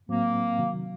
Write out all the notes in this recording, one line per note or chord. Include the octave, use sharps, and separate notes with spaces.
A2 F#3 A#3 C4
C3 D#3 F#3